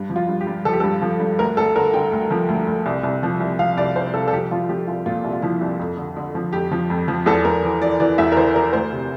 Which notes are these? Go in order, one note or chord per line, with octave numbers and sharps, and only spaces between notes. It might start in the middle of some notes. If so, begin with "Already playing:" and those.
Already playing: G2
F3
F4
G2
G4
G2
F3 A4
G4
G2 A4
F3
G2
D2 A#4
D2 A4
D3 A#4
D3 G5
D2
F3
D2
D2
C2
C2
F3
C2
F3 F5
C2 D5
C2 C5
C2 A4
A4
F3 G4
F3 F4
F3 G4
C2 F4
A#2 F4
C2
F4
F3 E4
C2
F2
D3
D3
F3
F2 G4
F3
F2
F3
E2 A4
E2 A#4
E3
E3 D5
E3 D5
E2 E5
A#4
E3 C5
E3 A#4
D2 C5
C3